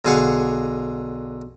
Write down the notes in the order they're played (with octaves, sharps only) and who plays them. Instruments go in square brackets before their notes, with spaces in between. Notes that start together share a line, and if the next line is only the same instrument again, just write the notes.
[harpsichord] B1 D3 G#4 F5 F#5 C#6